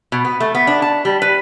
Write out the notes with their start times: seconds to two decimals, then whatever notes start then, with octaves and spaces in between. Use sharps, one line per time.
0.12 B2
0.25 B3
0.40 A3
0.55 B3
0.67 D4
0.82 A5
1.05 G3
1.22 B4